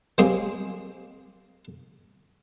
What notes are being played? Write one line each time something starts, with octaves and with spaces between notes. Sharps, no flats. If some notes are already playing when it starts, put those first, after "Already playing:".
F#3 G#3 A#3 C4 G4 G#4